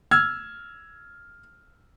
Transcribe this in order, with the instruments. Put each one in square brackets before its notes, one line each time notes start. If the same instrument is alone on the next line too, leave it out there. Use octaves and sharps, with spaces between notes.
[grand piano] E6 F6 G#6